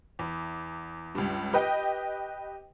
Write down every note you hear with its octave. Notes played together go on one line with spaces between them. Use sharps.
E2
C#2 G2
G4 B4 D#5 G5